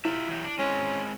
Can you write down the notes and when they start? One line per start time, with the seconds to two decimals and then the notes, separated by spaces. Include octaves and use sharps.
0.05 E4 F4 G4 E5
0.28 E3 F#3 G4
0.45 D4
0.59 G#3 C4 C#4